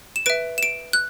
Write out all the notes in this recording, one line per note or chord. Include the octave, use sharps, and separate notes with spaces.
E7
B4 E5 D7
E7
D7
F#6